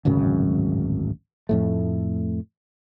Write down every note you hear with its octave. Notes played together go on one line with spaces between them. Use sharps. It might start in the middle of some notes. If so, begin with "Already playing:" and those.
D1 G#1 F#2 C#3
F2 A2 A3